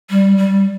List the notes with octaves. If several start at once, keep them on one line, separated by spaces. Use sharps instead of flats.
G3
G3